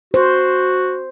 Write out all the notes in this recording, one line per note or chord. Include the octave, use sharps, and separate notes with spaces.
F#4 C5